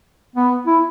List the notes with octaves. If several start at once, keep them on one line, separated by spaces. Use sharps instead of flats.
B3
E4